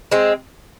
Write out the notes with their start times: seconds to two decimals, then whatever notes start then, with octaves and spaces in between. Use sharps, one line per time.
0.12 G#3 C4